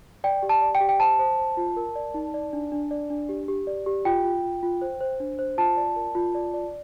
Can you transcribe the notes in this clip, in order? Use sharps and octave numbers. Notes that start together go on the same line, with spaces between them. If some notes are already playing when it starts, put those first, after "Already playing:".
D5 G5
G4
A5
D5
G5
G4
G5
C5 A5
C5
C5
F4
A#4
D5
D#4
D5
D4
D4
D5
D4
G4
G4
D5
G4
F4 G5
F4
F4
F4
C5
C5
D4
C5
F4 A5
D5
A#4
F4
D5
D5